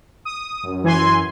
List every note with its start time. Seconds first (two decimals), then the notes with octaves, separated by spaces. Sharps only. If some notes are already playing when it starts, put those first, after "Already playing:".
0.25 D#6
0.64 F#2
0.84 E3 G#5 C6